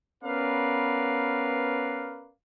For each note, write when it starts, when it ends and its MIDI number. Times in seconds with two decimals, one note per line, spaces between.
0.23 2.32 59
0.23 2.32 61
0.23 2.32 70
0.23 2.32 71
0.23 2.32 74
0.23 2.32 77